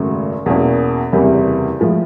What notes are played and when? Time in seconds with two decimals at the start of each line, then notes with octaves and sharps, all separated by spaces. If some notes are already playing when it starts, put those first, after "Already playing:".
Already playing: G#1 F#2 C#3 F#3 A3
0.46 E2 B2 F#3 A#3 C#4
1.12 F#1 E2 C3 E3 G3
1.80 A2 F3 G#3